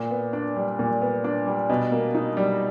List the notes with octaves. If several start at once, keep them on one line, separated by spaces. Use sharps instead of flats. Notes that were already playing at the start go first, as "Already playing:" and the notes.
Already playing: A#2
B3
D4
G3
A#2
B3
D4
G3
B2
A#3
D#4
G3